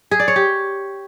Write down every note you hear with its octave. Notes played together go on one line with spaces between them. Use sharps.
G#4
D5
C#5
G4